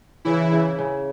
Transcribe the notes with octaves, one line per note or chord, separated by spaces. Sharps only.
C#3 E3 E4
C#3
C#3